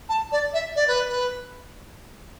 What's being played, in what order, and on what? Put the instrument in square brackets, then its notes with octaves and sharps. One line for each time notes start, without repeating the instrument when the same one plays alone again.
[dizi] A5
D5
E5
D5
B4
B4